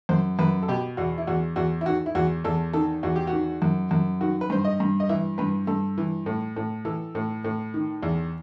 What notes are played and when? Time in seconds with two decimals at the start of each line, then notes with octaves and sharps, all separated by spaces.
0.09 F#2 C5
0.39 F#2 B4
0.63 A4
0.68 B2 G4
0.97 E2 F#4
1.18 E4
1.27 E2 F#4
1.56 E2 F#4
1.81 E4
1.86 D#3 F#4
2.06 E4
2.15 E2 F#4
2.44 E2 A4
2.73 D#3 A4
3.03 E2 F#4
3.16 G4
3.27 F#4
3.33 D#3
3.62 F#2
3.91 F#2
4.21 D#3 F#4
4.41 B4
4.50 G2 C5
4.65 D#5
4.80 G2
5.00 D#5
5.09 E3 E5
5.38 G2 B4
5.67 G2 A4
5.98 E3
6.26 A2
6.56 A2
6.85 E3 A4
7.15 A2
7.44 A2
7.74 D#3
8.03 E2